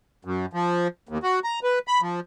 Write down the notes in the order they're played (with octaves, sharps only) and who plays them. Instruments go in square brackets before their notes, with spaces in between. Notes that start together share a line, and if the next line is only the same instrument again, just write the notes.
[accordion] F#2
F3
D#2
F#4
A#5
B4
B5
F3